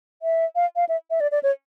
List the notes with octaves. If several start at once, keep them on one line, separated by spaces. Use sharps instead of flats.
E5
F5
F5
E5
E5
D5
D5
C#5